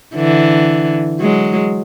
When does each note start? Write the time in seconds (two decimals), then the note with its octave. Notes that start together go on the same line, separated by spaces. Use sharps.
0.15 D3 E3
1.21 F#3 G#3